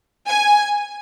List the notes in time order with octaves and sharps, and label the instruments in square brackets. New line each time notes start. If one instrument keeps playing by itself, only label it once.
[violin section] G#5